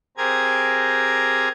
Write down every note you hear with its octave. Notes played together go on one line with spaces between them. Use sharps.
C4 G4 G#4 A#4 A#5 G#6